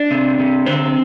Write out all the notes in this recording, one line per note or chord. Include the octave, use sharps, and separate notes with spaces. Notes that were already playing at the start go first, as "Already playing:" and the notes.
Already playing: D4
C3
C3
D3 C4